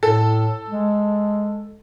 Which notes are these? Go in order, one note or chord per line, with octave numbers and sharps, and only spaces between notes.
A2 A4
G#3